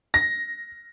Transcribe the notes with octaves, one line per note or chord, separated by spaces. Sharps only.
A#6